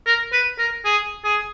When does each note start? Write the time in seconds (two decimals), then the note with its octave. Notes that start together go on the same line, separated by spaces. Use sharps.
0.06 A#4
0.32 B4
0.58 A#4
0.85 G#4
1.24 G#4